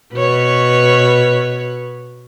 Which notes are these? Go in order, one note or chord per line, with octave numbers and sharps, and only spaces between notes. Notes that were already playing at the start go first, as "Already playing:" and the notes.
B2 B4 C#5